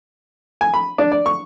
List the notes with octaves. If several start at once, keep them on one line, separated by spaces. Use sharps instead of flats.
G#5
B5
D4
D5
C#6